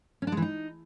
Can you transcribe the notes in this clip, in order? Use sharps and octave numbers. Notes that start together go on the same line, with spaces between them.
C#4
D4
G#3
E3
D#4